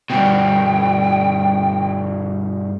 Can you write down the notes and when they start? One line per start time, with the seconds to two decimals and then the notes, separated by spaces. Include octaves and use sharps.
0.10 G2 B2 G5